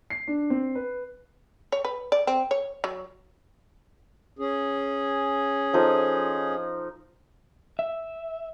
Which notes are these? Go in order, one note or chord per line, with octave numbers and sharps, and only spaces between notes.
C7
D4
C4
B4
C#5
B4
D5
C4
C#5
F#3
C#4 G#4
F3 D#4 A4
E5